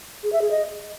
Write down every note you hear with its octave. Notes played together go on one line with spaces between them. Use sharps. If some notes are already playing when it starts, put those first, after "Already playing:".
G#4
E5
G#4
D#5